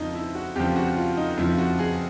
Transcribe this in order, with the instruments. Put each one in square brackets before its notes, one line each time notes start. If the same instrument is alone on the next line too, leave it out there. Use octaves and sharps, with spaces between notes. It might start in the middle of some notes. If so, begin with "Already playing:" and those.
Already playing: [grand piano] F2 C#3 F3 D#4
E4
F#4
F2 C#3 F3 G4
F#4
F4
D#4
F2 C#3 F3 E4
F#4
G#4